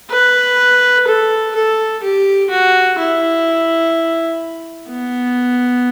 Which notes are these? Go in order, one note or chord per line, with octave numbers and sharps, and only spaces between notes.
B4
A4
A4
G4
F#4
E4
B3